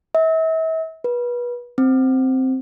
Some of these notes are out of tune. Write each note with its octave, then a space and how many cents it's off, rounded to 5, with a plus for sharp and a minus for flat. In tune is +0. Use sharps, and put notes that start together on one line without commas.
E5 -40
B4 -30
C4 +0